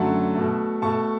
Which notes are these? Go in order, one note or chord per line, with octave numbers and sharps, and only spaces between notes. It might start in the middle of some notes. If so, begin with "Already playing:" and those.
Already playing: F#2 D3 F#3 A3 F#5 A5
B2 A3
B2 A3 A5 C#6